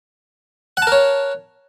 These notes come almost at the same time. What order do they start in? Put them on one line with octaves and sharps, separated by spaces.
F#5 A5 A#4 C#5